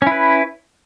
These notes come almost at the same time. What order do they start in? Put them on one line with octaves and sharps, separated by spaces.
C#4 E4 B4